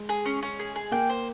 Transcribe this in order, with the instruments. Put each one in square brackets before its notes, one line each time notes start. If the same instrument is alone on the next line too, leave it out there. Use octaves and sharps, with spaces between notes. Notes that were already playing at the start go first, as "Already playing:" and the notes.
Already playing: [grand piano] G#3
[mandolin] G#4
C#4
C#4
G#4
G#4
[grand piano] A#3 [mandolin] G5
[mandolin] C5